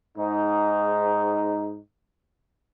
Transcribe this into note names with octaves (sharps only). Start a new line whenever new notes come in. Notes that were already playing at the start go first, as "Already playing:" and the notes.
G#2 D#4